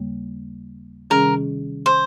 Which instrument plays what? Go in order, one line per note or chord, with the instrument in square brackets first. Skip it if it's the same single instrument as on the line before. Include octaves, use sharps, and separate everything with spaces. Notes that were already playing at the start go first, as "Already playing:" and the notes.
Already playing: [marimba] D#2 C#3 G3 A#3
[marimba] C3 D#3 G3 C#4 G#4 [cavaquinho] A#4
[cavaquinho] C5